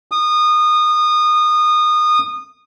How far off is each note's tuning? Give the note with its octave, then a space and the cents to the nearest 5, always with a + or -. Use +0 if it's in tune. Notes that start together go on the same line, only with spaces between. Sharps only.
D#6 -25